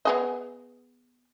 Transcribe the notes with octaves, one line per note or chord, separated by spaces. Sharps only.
B3 G#4 D#5